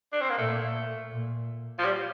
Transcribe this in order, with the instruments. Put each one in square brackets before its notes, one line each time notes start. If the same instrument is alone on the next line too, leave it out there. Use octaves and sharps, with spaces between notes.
[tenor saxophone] D4
C4
A#3
[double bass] A#2 [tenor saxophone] A3
[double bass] A#2
[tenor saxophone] F3
G3